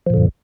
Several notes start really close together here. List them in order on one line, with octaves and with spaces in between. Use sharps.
F3 A#2 D3 F#2